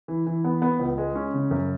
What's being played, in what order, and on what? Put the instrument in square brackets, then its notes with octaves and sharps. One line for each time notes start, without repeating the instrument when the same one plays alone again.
[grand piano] E3
E3
B3
B3
C#2
G#3
C#4
C#3
F#2